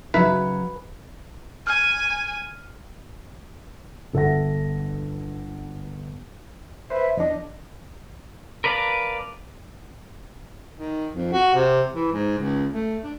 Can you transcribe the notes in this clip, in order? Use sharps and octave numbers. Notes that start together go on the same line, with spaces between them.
C#3 F#3 D#4 B4 E5
G#5 F6
G1 A4 E5 F#5 A#6
B4 C5 E5
E2 D4 D#5
A#4 B4 D5 F5 A5
D#3
F2
F#4
C3
E3
G#2
C#2
A3
D4